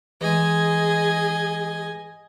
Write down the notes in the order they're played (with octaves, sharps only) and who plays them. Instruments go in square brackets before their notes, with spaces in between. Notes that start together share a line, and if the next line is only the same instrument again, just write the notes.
[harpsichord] E3 G#3 [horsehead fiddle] G#4 [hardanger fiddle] D#5 G#5